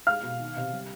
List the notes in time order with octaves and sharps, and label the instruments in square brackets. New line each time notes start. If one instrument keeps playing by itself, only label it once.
[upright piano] G#3 F5 F6
B2
D#3
C3
G3